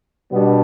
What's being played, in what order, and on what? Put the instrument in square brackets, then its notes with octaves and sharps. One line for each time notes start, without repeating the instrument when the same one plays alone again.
[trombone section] B2 G3 B3 D4